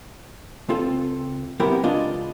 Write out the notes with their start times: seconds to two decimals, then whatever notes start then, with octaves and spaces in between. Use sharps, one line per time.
0.69 C#2 C4 F4 A4
1.60 F#3 B3 C4 E4 G4 A#4
1.83 C#2 G#3 D4 F4 D5 D#5